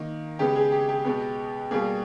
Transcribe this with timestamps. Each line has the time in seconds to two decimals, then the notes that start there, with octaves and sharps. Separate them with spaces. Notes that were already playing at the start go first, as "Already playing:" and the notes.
Already playing: D#3 A#3
0.39 C#3 G#3 B3 G4
0.56 G#4
0.72 G4
0.89 G4
1.05 B2 G#3 B3
1.71 B2 G3 A#3 G#4